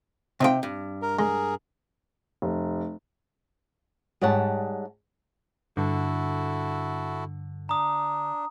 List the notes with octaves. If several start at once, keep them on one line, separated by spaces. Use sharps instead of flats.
C3 C4 D#4 F4 G5
G2
A#4
G#3 G#4 A#4
F1
G#2 G3 C#5 F#5 A5
G2 D3 E4 F#4 A4
D4 A#5 D#6